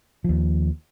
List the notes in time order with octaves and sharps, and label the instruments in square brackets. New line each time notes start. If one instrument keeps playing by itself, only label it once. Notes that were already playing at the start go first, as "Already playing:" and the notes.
[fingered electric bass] D#2 F3